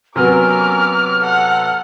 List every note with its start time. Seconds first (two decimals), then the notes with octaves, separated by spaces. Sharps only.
0.16 C3 F#3 B3 C#4 A#4 D6 F6
1.21 A4 F#5